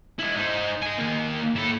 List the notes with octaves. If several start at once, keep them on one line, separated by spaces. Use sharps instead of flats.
G#3 E4
D#4 C5
D#5 G#5
D#3 A#3
E4 A4